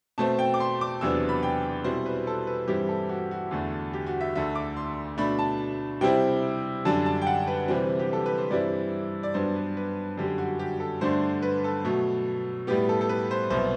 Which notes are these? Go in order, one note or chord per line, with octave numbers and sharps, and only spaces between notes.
B2 A3 C4 A5
G5
D6
C6
D6
E2 C3 F#3 B3 D4 E6
B5
G5
B2 G3 C4 E4 C5
B4
A4
B4
G2 E3 G3 C4 E4 G4
A4
F#4
F#4
E2 D3 A3
G4
F#4
E5
D2 D3 A3 E5
D6
C6
B2 A3 D4 B5
A5
C3 G3 C4 E4 G5
F#2 D3 G3 D4 A5
A5
G5
F#5
B4
C3 E3 G3 C4
G4
A4
B4
C5
G2 E3 G3 C4 E4 D5
D5
G2 F#3 B3 D4 C5
B4
B4
F#2 D3 G3 G4
F#4
G4
A4
G2 D3 A3 D4 C5
B4
A4
B2 F#3 A3
A2 G3 B3 G4
A4
A4
B4
C5
C2 B2 F#3 B3 C5